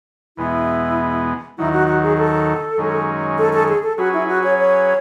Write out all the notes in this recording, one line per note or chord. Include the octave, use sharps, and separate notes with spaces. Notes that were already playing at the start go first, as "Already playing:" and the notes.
E2 B2 G#3 B3 E4
D#2 D#3 F#3 E4
F#4
F#4
G#4
A4
F#2 D#3 G#3 C#4
A4
A4
G#4
A4
F#3 C#4 F#4 G#4 B4
E4
F#4
C#5
C#5